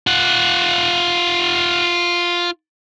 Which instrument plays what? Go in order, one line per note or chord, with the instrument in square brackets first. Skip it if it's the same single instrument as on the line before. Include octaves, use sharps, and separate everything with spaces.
[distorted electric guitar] F4 F#5